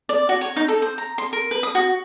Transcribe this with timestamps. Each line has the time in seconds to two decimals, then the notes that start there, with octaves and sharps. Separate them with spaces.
0.09 D5
0.29 F#4
0.41 C#5
0.56 D#4
0.68 A4
0.82 C5
0.98 A#5
1.18 C6
1.33 A#4
1.51 B4
1.63 D#6
1.75 F#4